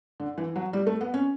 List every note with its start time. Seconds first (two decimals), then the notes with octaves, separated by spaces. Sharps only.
0.20 D3
0.38 E3
0.56 F#3
0.73 G3
0.87 A3
1.01 B3
1.14 C#4